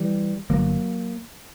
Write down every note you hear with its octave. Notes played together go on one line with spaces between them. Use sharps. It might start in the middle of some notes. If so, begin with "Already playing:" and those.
Already playing: E3 G3
G1 G2 D3 F#3 A#3